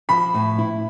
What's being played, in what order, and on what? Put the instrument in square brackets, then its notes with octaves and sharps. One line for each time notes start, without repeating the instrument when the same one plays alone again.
[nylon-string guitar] F3 [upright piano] B5
[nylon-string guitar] A2
E4